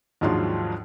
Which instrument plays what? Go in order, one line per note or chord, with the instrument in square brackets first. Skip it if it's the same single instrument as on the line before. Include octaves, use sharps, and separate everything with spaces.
[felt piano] D#2 G#2 F3 F#3 D4 C6